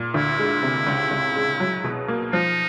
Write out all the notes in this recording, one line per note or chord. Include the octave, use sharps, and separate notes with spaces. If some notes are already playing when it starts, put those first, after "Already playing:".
Already playing: A#2
D2 E4
G#3
C3
C#2
C#2
G#3
F#3
B2
A#3
F3 D#4